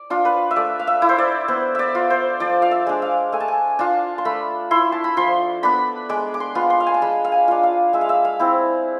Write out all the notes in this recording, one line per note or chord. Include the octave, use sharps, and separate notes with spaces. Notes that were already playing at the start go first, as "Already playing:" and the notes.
Already playing: D5
D4 F4
B4
E5
A3 D5
F5
E5
E4
C5
D5
B3 C5
D5 E5
F4
C5
F3 D5
F5
E5
G#3 D4
F5
A3 G#5
A5
G#5
D4 F4 A5
C6
A3 B5
E4 C6
A5
B5
F3 C6
B3 D4 B5
G#3 D6
D6
C6
B3 F4
C6
F5
G#5
A5
G#3 B5
F5
G#5
D4 F4
F5
G#3 E5
F5
E5
F5
C4 E4